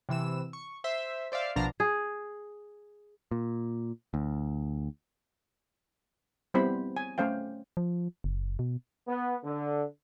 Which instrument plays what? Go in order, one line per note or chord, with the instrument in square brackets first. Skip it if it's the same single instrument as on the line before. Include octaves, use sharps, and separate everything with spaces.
[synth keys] C3 E3 E6 E7
C#6
C5 E5
C5 D5 E5 F5
A#1 B2 F3 D4 F5 A#5
[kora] G#4
[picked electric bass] A#2
D2
[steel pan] G3 B3 C4 E4 C5 B5
G#5
A3 C#4 C5 F5 G5
[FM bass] F3
F#1
B2
[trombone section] B3
D3